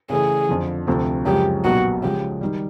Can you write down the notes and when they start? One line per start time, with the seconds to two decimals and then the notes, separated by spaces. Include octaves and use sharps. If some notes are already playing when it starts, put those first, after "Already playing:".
0.10 C#3 E3 A3 C#4 G#4
0.49 F2 D3 F3
0.87 D2 C3 F3 A3 C4
1.25 F#2 C#3 F3 G#3 C#4 G4
1.64 B1 A#2 F#3 B3 F#4
2.03 C#3 F3 G#3 G4
2.41 D#3 G3